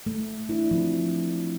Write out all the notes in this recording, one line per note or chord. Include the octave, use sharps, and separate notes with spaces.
A3
D4 E4
F3 C4